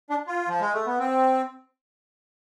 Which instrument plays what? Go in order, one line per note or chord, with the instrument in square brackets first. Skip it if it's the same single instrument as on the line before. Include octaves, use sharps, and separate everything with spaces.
[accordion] D4
F4
F3
G#3
A3
B3
C4